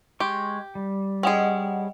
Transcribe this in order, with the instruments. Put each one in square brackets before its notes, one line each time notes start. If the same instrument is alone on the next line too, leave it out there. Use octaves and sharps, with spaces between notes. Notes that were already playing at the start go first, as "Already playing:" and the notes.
[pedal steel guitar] G#3 C6 C#6 [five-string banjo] G4
[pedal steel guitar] G3
[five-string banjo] C#4 G#4 [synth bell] D#5 F#5 G5